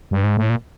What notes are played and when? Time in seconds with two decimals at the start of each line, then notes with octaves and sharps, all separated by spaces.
0.11 G2
0.24 G#2
0.37 A2
0.50 A#2